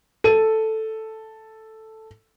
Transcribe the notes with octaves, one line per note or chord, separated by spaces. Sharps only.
A4 D#7